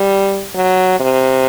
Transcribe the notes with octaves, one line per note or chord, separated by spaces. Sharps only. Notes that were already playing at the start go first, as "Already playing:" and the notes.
Already playing: G3
F#3
C3